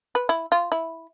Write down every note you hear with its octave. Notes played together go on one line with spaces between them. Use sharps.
B4
E4
F4
E4